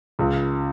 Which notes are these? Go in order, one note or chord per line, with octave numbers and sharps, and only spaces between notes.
C#2